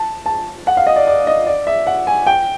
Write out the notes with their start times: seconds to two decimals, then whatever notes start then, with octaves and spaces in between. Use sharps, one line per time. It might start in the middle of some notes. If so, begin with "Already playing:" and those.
Already playing: A5
0.26 A5
0.67 F#5
0.77 F5
0.87 D#5
0.96 D5
1.07 D5
1.27 D#5
1.47 D5
1.67 E5
1.87 F#5
2.07 G#5
2.26 G5